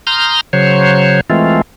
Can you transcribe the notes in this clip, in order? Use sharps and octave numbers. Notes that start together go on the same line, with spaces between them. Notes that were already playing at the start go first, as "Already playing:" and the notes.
A#5 C6 D#6 F6 G6
C#3 F#3 C5 C#5
E3 G#3 A3 C4 F4